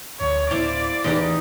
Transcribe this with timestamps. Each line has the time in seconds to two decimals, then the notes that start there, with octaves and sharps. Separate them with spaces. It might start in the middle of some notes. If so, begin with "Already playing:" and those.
0.20 D2 F3 C#5
0.51 D1 B3 E4 C5 D5 F5
1.04 A1 E2 D#4 G4 D#5